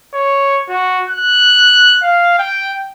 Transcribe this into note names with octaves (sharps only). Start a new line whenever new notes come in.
C#5
F#4
F#6
F5
G5